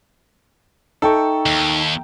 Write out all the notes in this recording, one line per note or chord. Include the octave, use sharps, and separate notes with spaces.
D#4 A4 E5 G5 A#5 C#6
D#2